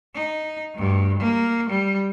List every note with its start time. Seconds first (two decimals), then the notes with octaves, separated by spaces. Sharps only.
0.14 D#4
0.75 D2 G2
1.19 A#3
1.69 G3